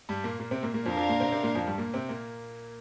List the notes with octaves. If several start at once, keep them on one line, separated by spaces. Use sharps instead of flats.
G2 G3
A#2 A#3
A#2 A#3
C3 C4
A#2 A#3
A#2 A#3
F2 F3 D4 A#4 F5
F2 F3
A#2 A#3
C3 C4
C3 C4
A#2 A#3
F2 F3
G2 G3
A#2 A#3
C3 C4
A#2 A#3